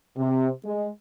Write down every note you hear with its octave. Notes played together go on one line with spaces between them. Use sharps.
C3
G#3